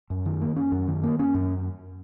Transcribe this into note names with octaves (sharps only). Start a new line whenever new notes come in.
F#2
D#3
A#3
C#4
F#2
D#3
A#3
C#4
F#2